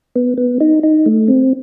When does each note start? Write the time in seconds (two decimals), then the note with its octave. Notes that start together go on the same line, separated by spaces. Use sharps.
0.16 B3
0.38 B3
0.61 D#4
0.83 D#4
1.06 A3
1.28 C4